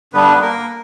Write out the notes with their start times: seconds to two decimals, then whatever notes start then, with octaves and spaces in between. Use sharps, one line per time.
0.14 G2 D3 G3 B3 D4 B4
0.41 A#3 A#4